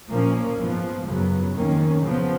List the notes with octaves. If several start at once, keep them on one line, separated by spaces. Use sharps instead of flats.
A#2 F3 A#3 C#4
G#2 F3 B3
F#2 C#3 F#3 B3
F2 D#3 A#3 C#4
C#3 F3 B3